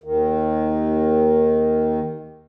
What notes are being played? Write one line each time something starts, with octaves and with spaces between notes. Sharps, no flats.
D#2 D#3